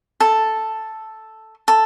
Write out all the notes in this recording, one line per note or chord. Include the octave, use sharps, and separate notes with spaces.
A4
A4